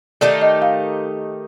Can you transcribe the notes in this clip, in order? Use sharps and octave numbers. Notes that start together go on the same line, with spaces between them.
D#3 A3 D#4 G4 D5
D#5
F5